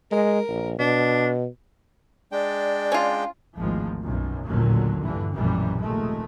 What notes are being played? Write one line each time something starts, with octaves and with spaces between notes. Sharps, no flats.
G#3 A#4
A#1
B2 D4
G#3 D4 D5 G5
C#4 F4
G#1 D2 A2 F3 G#3 A#3
B1 F#2
A1 D#2 A#2 D3 F#3
A#1 G2 D3 E3
F1 A#1 F#2 B2 E3 G3
F1 D#2 G#3 A3